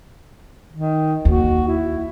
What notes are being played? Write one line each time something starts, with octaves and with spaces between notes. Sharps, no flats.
D#3
D#2 F#4
E4